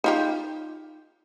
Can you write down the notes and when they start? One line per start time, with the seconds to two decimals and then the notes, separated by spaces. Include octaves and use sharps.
0.04 D#4 F4 G4